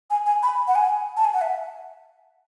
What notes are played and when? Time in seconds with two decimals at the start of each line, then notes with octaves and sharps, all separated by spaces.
0.10 G#5
0.26 G#5
0.43 B5
0.68 F#5
0.75 G#5
1.17 A5
1.25 G#5
1.33 F#5
1.41 E5